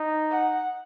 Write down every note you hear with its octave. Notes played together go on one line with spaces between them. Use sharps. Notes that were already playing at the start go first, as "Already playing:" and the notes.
Already playing: D#4
F#5